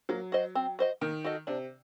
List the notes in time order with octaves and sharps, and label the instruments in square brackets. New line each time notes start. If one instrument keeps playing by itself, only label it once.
[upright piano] F#3 [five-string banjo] A#3
[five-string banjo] F#4 C5 D#5
C4
F#4 C5 D#5
[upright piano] D#3 [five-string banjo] A#3
[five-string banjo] F#4 A4 D#5
[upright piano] C3 [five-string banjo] D4